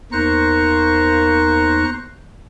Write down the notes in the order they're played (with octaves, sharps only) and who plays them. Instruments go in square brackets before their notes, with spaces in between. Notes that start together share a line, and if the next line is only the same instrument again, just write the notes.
[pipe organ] E2 D#4 F#6 [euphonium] A#3 [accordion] C5 A#5 C#6